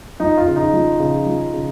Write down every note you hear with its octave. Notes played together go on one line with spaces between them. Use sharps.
F3 D#4
F4
C#3
D#4
F3
C#3
F3
C#3